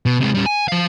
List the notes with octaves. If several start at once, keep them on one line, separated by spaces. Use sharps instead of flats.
B2
C3 G#3
G3 C#4
G#5
F3 F5